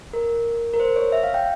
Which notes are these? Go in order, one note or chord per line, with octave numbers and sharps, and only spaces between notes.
A#4
A#4
C5
C#5
E5
F5
G5